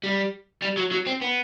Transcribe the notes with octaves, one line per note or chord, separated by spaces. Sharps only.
G3
G3
F#3
F#3
C4
B3